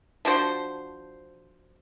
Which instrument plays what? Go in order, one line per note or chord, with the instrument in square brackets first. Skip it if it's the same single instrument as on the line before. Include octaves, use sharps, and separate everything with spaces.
[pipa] F3 D4 F#4 C5